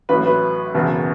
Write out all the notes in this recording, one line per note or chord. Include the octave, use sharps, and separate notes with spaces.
A1 A2 F#3 B4
B4
F#1 E2 B2